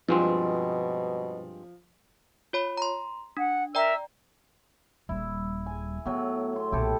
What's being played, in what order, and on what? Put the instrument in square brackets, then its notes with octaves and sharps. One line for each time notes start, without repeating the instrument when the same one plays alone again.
[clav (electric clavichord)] G2 G#3 C4 [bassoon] B2 [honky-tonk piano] F3
[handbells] F4 C#5 B5
A#5 C6
[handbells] D4 [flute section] F#5
[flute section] A#4 E5 E6 [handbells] D5 G5 A#5
[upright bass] D#1 G3 [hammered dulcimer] E4
[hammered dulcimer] G#5
[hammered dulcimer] A2 F#3 [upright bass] B3
[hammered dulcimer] C6
[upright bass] B1 A#2 [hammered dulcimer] E4 G4 A4